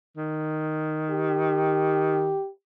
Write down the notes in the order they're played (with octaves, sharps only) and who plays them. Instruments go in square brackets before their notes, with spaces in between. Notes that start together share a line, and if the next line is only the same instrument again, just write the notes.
[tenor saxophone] D#3
[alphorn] G4